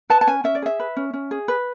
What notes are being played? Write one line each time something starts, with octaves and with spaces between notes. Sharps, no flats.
B4 A5
A5
C#4 G#5
C#4 E5
D5
G#4 E5
B4
C#4
C#4
G#4
B4